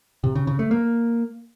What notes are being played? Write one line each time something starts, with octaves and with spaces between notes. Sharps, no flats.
C3
C#3
C#3
A3
A#3